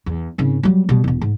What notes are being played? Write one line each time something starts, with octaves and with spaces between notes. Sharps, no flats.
E2
G#1 C#3
F#3 G3
B2 G3
E1 B2
G#2